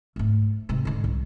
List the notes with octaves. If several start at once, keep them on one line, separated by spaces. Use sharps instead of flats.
G#2 A3
G#2 C3
G#2 D3
C2